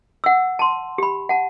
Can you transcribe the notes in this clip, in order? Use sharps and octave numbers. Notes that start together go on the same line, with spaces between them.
F#5 E6
A5 C6
G4 B5
F#5 A5